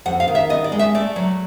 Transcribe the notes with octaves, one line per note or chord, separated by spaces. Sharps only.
F2 F#5
F5
D#3
E5
B3 D#5
D5
G#3
E5
A3 D5
F#3